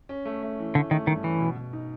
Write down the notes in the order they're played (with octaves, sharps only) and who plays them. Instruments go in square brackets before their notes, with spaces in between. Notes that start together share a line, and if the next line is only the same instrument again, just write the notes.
[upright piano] C#4
A3
A3
E3
[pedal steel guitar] D3 [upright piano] A3
[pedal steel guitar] D#3 [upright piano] A3
[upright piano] G2 [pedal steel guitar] D#3
[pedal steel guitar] E3 [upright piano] C#4
[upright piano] B2
B2
D#4